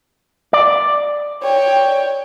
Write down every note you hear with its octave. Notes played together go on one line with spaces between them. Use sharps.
D5
C#5 G5